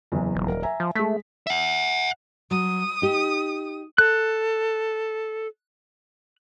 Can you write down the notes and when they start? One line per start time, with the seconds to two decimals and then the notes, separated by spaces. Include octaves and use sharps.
0.12 F#1 E2
0.35 D#1
0.48 A#4
0.63 E5 G#5 A#5
0.80 F3
0.95 G#3 A3 B6
1.47 E5 F#5
2.51 F#3 D#6
3.02 D#4 G4
3.98 A4 F#6